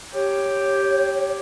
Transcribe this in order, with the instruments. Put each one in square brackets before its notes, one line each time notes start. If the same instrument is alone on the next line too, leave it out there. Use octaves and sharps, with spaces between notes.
[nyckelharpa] G4 [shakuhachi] C#5